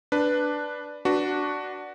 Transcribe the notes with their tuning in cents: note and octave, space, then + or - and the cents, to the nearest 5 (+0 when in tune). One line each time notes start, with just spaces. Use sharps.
D4 +0 B4 +0
D4 +0 F#4 +5 B4 -15